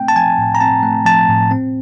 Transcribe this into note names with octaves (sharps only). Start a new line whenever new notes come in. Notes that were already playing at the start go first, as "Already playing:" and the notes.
Already playing: A3 C4 G5
A5
F3 G#5
A2
A#5
C4 A5
A3
F3 A5
A2
C4